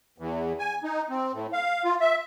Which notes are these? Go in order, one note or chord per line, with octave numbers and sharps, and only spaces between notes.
E2
G#5
D#4
C4
A2
F5
F4
E5